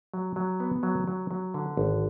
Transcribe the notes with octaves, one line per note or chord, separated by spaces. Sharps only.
F#3
F#3
B3
F#3
F#3
F#3
D3
G#1